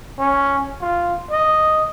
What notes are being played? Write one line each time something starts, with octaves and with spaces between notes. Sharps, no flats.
C#4
F4
D#5